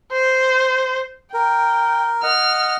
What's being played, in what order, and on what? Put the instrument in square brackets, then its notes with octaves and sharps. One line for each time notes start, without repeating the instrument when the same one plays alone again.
[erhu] C5
[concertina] A#4 [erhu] G5
[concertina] D#5 F#5 [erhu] F6